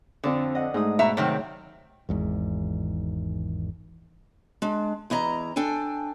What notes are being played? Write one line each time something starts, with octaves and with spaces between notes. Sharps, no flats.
F2 D3 D5 D#6
D#5 F#5
G#2 A3 D#6
B2 E5 A#5
C3 D#3 F#3 C4
G#1 E2 G#2
G#3 D4
E2 E4 D#5 A#5
D4 A4 G5 G#5